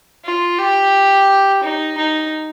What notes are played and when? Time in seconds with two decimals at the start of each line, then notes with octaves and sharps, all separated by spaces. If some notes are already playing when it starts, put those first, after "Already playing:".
0.25 F4
0.59 G4
1.64 D#4
1.98 D#4